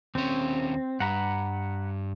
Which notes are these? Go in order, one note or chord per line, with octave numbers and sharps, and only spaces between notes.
D#2 C4 C#4
G2 F#5 A#5 B5